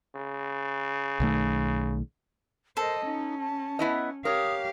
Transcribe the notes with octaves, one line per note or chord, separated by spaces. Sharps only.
C#3
B1 D#3 A3
A4 A#4 C5 D#5
C#4 D#4
A5
B3 E4 D#5
G4 A#4 C#5 F5 D#6